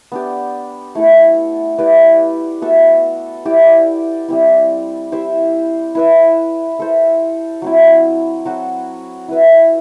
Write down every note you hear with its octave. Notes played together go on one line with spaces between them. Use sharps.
B3 D4 G4
A3 E4 A4
E4 G4 B4 D5
B3 F#4 A4 E5
E4 G4 D5
G3 C4 E4
E4 G4 C5 E5
E4 B4 E5
E4 A4 C5
F#3 C4 E4
F#3 C4 F#4 A4
E4 B4 E5